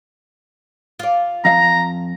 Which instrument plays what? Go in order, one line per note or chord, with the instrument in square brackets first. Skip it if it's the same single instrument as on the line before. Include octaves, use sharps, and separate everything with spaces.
[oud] F4 D5
[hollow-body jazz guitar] F2 F5 [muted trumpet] A#5